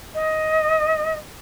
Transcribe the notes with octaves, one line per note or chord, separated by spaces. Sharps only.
D#5